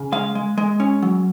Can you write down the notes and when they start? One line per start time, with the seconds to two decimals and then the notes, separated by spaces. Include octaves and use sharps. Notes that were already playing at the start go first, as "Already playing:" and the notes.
Already playing: C#3
0.12 G#3 F5
0.35 G#3
0.58 G#3
0.80 C#4
1.02 F#3